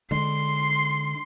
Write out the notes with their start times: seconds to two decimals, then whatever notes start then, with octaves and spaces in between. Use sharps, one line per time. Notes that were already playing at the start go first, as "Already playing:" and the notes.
0.11 D3 G#3 C6